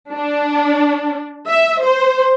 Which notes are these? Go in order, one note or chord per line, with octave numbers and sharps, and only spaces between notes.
D4
E5
C5